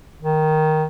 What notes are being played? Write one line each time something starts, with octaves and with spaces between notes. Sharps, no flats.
D#3